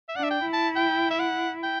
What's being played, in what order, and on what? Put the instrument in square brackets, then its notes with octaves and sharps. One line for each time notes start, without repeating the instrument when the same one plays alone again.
[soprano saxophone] E5
[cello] D4 [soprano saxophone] F#5
[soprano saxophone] E5
G5
[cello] E4
[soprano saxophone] A5
G5
E5
F#5
G5